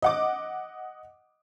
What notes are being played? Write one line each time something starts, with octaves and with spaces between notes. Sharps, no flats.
D#5 F#5 D6